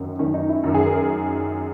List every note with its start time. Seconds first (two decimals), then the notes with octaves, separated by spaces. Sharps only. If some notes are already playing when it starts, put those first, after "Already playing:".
Already playing: F#2 D#3
0.19 F#2 D#3 C#4
0.34 D#4
0.49 E4
0.64 F#2 D#3
0.74 G#4
0.86 A#4
0.97 A#4